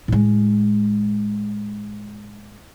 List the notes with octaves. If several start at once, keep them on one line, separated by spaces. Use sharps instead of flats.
A2 G#3